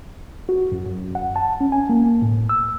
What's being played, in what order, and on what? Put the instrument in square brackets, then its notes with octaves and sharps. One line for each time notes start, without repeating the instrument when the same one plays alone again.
[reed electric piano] F#4
F#2
F#2
F#5
A5
C#4
G#5
A#3
A2
E6